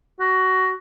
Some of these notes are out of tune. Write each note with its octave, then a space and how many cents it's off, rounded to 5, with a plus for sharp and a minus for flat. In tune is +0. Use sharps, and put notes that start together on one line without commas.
F#4 +15